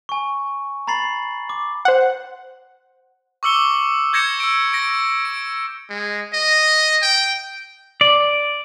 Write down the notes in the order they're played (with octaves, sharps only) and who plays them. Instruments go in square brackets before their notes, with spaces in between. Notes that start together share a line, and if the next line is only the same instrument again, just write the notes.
[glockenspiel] G#5 C#6
A#5 B5 A6 C7 F#7
D6
[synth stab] C5 F#5
[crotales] C#6 D6 E6 C#7 G7
D6 G6 G#6 A#6 C#7 E7
E6 D7
A#6 D7
D7
[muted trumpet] G#3
D#5
G5
[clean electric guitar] D5